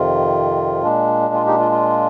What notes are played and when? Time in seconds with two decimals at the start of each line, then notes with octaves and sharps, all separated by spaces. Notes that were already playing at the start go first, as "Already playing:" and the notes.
Already playing: F2 C3 D#3 F4
0.82 A#2 G#3 D4
1.34 F4
1.47 D#4 G4
1.59 F4
1.72 F4